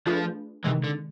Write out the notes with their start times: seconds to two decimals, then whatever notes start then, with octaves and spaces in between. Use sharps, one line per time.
0.06 F3 A3 D4 F4 G#4 B4
0.64 C3 D#3 E3 G#3
0.84 D3